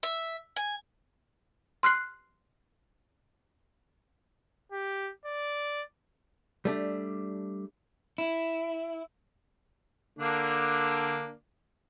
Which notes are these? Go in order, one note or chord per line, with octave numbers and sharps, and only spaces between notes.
E5
G#5
C6 F6 F#6 C7
G4
D5
G3 A3 D4
E4
D3 A#3 D4